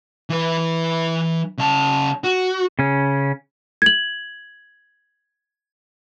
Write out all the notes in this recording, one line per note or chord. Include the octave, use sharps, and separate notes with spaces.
E3 B4
C#3 A5
F#4
C#3 C#4
G#6 F#7